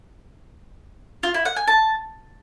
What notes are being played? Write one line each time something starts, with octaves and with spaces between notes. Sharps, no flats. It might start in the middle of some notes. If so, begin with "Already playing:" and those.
F4
E4
F#5
G#5
A5